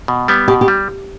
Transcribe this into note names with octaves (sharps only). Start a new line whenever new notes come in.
B2
G3 B3
B2 G4
G4
G3